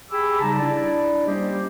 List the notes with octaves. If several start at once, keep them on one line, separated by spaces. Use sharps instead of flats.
G4 G#4 G#5 B5 D6 E6
C#3 G3 D#4 A5 A#5
D4 E4 D5
G3 A#3 C#4 G4 C5 D#5